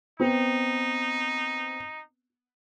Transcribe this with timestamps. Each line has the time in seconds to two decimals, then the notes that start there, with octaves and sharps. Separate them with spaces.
0.20 B3 C4 D#4